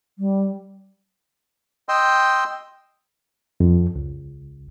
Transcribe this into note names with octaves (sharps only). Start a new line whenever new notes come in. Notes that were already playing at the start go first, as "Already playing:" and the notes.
G3
D#5 G5 C6 E6
F2
C#2